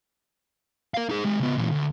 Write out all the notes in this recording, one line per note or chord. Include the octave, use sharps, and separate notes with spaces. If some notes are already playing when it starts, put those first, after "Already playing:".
A#4 F5
D#4 G#4
G#3 G4
C#3 B3
A#2 E3
D2